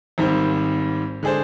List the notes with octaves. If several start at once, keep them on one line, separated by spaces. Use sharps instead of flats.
G#1 G#2 D#3 G3 C4
D3 G#3 D4 G#4 C5